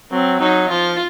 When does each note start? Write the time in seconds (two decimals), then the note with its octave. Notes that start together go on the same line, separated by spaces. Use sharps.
0.11 F#3 C4
0.40 F#3 D#4
0.69 F3 F4